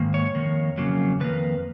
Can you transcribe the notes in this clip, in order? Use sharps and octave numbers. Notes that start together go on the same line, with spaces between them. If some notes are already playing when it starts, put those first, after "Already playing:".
Already playing: G#2 D#3 A#3
C#5
F2 D#3 A#3
F2 C#3 F#3 A#3
F2 D#3 A#3 B4